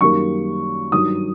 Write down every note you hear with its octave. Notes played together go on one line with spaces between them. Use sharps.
F#2 D#3 G3 A#3 C#6
G2 D#3 F#3 D#6